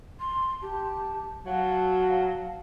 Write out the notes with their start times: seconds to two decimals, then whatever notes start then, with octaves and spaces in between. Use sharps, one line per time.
0.20 C6
0.62 G4 A5
1.46 F#3 F5 A5